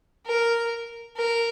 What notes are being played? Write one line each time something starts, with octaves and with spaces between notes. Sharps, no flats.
A#4
A#4